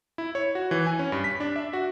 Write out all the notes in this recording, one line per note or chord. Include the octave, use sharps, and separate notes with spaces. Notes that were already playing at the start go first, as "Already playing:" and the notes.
E4
C#5
F#4
E3
G#5
C#4
G2
B6
D4
E5
F#4